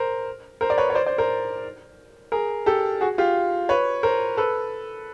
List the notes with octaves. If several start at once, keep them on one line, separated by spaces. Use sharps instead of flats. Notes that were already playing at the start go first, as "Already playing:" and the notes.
Already playing: A#4 C5
A#4 C5
D5
B4 C#5
C#5
C5 D5
C5 D5
A#4 C5
G#4 A#4
G4 A4
F#4 G#4
F4 G4
B4 C#5
A#4 C5
A4 B4